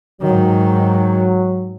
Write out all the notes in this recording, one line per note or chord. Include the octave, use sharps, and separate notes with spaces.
G#2 D#3 F#3